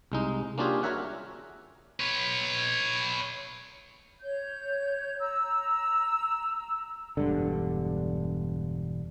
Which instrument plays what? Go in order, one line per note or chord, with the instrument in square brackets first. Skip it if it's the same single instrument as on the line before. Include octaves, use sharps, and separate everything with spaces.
[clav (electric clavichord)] C2 G#3 D#4
A#3 C#4 D4 F4 G4 G#4
F#4 A#4 C#5 E5 F#5
[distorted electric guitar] B4 C#5
[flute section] C#5 G6
A#5 E6
[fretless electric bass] E1 G2 D3